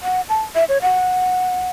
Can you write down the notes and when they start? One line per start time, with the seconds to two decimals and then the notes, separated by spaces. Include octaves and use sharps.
0.03 F#5
0.29 A5
0.55 E5
0.69 C#5
0.82 F#5